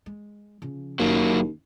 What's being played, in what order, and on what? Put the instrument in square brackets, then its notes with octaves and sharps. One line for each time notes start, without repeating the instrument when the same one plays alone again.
[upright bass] G#3
C#3 F3
[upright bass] F#1 [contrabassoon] D#2 [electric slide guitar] F#3 A#3